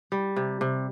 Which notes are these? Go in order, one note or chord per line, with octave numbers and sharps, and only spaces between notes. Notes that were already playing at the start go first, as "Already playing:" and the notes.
G3
C3
C3